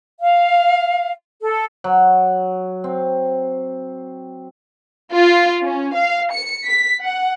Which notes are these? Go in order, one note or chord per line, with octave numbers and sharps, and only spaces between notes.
F5
A4
F#3
C4
F4
C#4
F5
C#7
B6
F#5